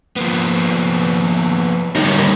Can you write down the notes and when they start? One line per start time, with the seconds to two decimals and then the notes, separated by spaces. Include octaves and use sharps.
0.16 F3 A#3 B3
1.95 D2 G3 D#4 A#4 C#5